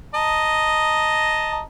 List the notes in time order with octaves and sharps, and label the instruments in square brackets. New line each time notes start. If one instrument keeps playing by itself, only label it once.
[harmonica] D#5 A5 A#5